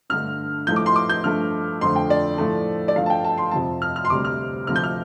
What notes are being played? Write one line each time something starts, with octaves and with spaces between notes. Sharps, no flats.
G2 D3 A3 F6
A2 F3 A3 G6
D6
C6
D6
G6
G2 F3 A3 F6
F2 D3 F3 A3 C6
G5
D5
A2 F3 A3
D5
G2 F3 A3 F5
A5
G5
A5
C6
F2 C3 F3 A5
F6
F6
C6
D2 C3 G3 D6
F6
D2 C3 F3 F6
G6
F6